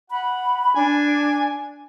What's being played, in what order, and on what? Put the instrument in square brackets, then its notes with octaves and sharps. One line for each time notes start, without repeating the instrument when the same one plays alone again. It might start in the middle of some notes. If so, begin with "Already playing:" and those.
[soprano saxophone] F#5 [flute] B5
[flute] D4 [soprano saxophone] G#5